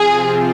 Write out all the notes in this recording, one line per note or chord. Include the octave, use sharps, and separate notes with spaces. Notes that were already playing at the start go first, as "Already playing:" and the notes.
Already playing: C3 F3 C4 F4 G#4